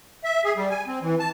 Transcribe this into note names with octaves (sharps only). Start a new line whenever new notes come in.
E5
G#4
G3
G#5
C4
E3
A5